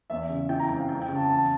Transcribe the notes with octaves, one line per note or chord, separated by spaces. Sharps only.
E2 E5
C#3
E3 G5
A#5
F2 G5
F5
F2 G5
G5
C#3
A5
E2 A5